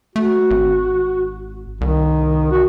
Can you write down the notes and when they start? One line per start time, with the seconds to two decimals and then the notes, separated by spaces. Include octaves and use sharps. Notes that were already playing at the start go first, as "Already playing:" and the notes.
0.16 A3 F#4
0.50 G#1
1.81 C2 D#3
2.51 F#4